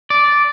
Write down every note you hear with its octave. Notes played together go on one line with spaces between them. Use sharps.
D5